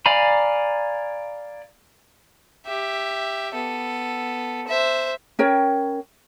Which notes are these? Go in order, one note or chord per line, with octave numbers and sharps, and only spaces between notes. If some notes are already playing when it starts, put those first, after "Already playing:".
D5 F5 G#5 A#5 B5
G4 E5
B3 A4
C5 E5
C#4 A#4 C#5 G5